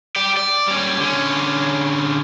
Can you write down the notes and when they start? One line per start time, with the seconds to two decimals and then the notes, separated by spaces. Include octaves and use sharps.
0.16 G4 D5
0.37 D5
0.68 G3 C#4
1.00 D3 C#4